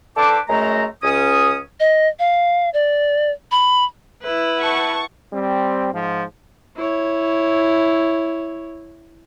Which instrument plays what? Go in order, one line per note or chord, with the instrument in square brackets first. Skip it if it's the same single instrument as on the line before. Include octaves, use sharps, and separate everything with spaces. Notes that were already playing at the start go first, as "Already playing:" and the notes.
[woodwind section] D3 A4 B4 C5 D6
F#2 G#3 A3 A#5
C#2 C#4 D#6
[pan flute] D#5
F5
D5
B5
[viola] E4 B4
[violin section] F#5 A5 C#6
[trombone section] G3 C4
G#2 F3
[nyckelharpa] E4 C#5